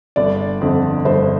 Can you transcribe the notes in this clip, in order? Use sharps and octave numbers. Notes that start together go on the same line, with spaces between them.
G1 D5
F2 D3
G1 C5